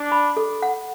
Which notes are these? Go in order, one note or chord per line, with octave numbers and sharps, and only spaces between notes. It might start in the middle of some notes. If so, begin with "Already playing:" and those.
Already playing: D4
B5
A4
F#5